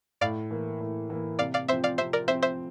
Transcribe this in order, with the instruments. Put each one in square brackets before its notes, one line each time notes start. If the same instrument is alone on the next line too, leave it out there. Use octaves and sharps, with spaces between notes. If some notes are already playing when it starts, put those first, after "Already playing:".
[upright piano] A2 [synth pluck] D5 F5
[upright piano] E3 A#3
A2
E3 A#3
[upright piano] C3 [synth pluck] D5 F5
[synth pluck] D5 F5
[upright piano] F3 C4 [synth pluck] C5 E5
[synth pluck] D5 F5
[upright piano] C3 [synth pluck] C5 E5
[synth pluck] A#4 D5
[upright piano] F3 C4 [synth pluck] C5 E5
[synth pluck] C5 E5